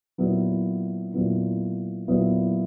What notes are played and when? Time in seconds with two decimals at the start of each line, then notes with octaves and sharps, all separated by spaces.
0.18 A#2 F#3 B3 E4
1.14 A#2 F#3 B3 E4
2.08 A#2 F#3 B3 E4